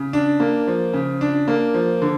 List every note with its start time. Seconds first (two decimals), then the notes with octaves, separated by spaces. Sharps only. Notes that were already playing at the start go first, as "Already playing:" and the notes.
Already playing: C#3
0.13 D4
0.40 A#3
0.67 F3
0.94 C#3
1.21 D4
1.48 A#3
1.74 F3
2.02 D3